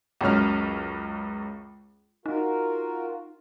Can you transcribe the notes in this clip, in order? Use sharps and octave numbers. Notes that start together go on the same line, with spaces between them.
C#2 F#2 C#4 F6
D#4 F4 F#4 A#4